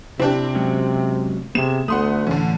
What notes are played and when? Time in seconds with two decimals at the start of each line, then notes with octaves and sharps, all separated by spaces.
0.20 C3 C4 D4 E4 G4
0.55 F#3 G#3 C#4
1.55 C3 B3 G#4 E7
1.88 D2 A3 B3 F#5 C6 D#6
2.27 A2 D3 E3 C#4